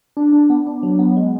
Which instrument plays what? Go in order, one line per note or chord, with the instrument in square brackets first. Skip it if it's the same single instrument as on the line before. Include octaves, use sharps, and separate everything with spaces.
[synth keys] D4
D4
B3
D4
F#3
B3
G#3